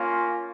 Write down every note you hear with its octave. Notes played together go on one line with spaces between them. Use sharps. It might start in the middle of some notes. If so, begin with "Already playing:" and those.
Already playing: A#3 C#4 F4